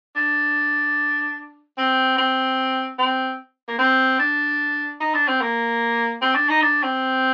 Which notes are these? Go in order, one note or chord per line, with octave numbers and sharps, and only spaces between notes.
D4
C4
C4
C4
A#3
C4
D4
D#4
D4
C4
A#3
C4
D4
D#4
D4
C4